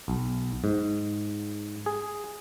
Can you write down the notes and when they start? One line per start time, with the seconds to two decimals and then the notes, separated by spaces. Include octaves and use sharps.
0.08 B1
0.64 G#2
1.86 G#4